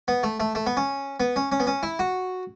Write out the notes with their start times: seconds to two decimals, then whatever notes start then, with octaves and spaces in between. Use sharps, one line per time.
0.08 B3
0.23 A3
0.40 A3
0.55 A3
0.66 B3
0.77 C#4
1.20 B3
1.36 C#4
1.52 C#4
1.60 B3
1.67 C#4
1.83 E4
1.99 F#4